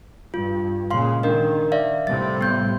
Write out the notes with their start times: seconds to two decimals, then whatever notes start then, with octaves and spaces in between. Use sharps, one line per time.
0.34 G2 F4
0.91 A#2 C#3 G#3 F5 C6
1.23 D#3 D4 A#4 D#5
1.72 D5 E5 F5
2.07 A2 C3 G3 A6
2.41 B3 G6